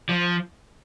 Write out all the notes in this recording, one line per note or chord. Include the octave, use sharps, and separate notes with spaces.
F3